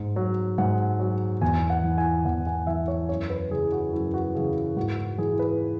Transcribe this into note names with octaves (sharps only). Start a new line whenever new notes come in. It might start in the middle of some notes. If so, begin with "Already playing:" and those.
Already playing: G#2
F#3
G#2 F#5
F#3
E2 G#5
F#5
E3
G#5
E2 F#5
G#5
E3 E5
C#5
F#2 C#5
B4
C#3 E3 G#4
F#4
F#2 E4
F#4
C#3 E3 G#4
G#2 F#4
F#4
E3 G#4
B4